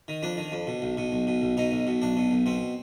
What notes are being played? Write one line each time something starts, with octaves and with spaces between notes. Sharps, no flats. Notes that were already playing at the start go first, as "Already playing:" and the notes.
D#3
F2 D4
D#3
F2
B2
B1
B2
B1
B2
B1
B2 D#4
B1
B2
B1 D4
B2
B1
B2 C4